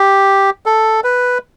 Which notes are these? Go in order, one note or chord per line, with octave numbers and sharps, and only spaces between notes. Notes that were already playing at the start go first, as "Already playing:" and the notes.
Already playing: G4
A4
B4